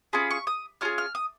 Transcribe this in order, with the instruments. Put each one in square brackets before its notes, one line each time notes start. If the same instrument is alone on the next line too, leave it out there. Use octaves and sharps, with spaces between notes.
[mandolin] C#4 F4 G#4 B5
C#6
D#6
C#4 F4 G#4 F6
F6
D#6